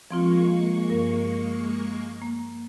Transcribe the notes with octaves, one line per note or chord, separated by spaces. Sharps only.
F3 G#3 A#3 C4 F4 C#6
G2 A#4
A#3